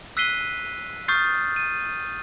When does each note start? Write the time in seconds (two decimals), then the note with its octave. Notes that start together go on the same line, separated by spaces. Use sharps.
0.17 E6 F#6 B6 C7 D#7 G7
1.08 C#6 D#6 F6 G6 A6 C7
1.56 D#7